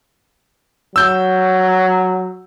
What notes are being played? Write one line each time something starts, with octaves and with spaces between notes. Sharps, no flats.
F#3 E6 G6